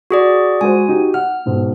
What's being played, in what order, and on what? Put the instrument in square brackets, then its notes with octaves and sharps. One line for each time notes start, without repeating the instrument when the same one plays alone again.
[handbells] F#4 G#4 D5
[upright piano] G#3 F#4 C5 [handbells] G#5
[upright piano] D#4 F#4 G4
[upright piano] F#5 [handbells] F6
[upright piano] B1 G#2 B2